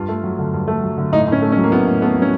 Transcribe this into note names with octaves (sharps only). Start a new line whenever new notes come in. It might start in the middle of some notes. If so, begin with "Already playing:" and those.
Already playing: G2 F4
A3
F#3
D3
G2
A3
F#3
D3
A2 D#4
A2 C#4
A3
C#4
F#3
A#3
A2 B3
A2
A3 B3
F#3
C#4